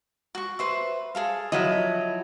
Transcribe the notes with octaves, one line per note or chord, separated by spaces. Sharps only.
F#4 C#6
B4 C5 E5
G#4 A4 F5
F3 F#3 E4 D#5